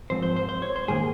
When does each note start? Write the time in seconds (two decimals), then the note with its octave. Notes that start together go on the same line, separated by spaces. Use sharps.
0.10 G#2 F3 C4 C5
0.23 C5
0.36 C5
0.49 C5
0.62 C#5
0.76 C5
0.88 G#2 D#3 A#3 G#4